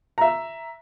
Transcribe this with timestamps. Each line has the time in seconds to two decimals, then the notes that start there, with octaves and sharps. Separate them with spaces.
0.18 E5 A#5